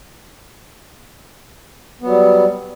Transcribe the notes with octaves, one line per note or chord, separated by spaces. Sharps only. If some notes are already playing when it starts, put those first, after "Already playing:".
F#3 G3 B3